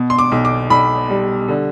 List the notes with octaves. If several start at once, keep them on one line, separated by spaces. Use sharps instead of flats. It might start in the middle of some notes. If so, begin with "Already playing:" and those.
Already playing: B2
C6
D6
B1
D6
B1 B5
G3
D3